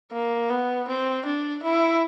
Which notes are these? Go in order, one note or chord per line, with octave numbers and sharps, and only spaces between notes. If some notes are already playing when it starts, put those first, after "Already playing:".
A#3
B3
C4
D4
E4